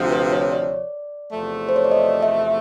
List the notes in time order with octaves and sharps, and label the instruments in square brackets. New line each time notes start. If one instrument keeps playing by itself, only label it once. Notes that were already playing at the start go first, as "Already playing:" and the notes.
Already playing: [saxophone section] D2 C3 F3
[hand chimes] B4
C#5
C#5
D5
[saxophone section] E2 C3 F3 A3
[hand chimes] C5
C#5
D5
D#5
E5